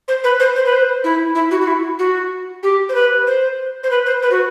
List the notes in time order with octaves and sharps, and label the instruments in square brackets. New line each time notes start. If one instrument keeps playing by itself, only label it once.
[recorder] C5
B4
C5
C5
B4
C5
E4
E4
F#4
F#4
E4
F#4
G4
C5
B4
C5
C5
B4
C5
B4
F#4